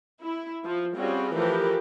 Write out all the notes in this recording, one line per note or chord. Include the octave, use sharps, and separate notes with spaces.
E4
F3
G3 C4 C#4 F4 F#4 G#4
E3 F3 A3 G4 A#4 B4